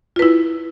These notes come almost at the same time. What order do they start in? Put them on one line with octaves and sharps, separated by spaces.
F4 B4 E4